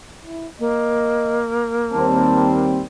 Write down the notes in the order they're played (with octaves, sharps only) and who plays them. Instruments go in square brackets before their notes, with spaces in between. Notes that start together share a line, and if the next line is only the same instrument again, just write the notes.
[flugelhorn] E4
[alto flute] A#3 [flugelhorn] D#5
[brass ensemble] D#2 G3 C4 [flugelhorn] A5